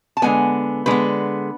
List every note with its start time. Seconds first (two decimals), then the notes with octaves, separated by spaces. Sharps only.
0.17 A5
0.22 D3 G#3 B3 G#5
0.86 D3 G#3 B3 B4